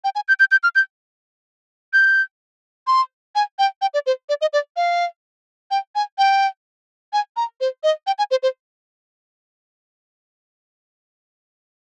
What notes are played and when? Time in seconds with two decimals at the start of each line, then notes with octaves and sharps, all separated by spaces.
0.04 G5
0.15 G#5
0.28 G6
0.40 G6
0.51 G6
0.63 F6
0.75 G6
1.93 G6
2.87 C6
3.35 G#5
3.59 G5
3.82 G5
3.94 D5
4.06 C5
4.29 D5
4.41 D#5
4.53 D5
4.77 F5
5.71 G5
5.95 G#5
6.18 G5
7.13 G#5
7.37 A#5
7.61 C5
7.83 D#5
8.07 G5
8.18 G#5
8.31 C5
8.43 C5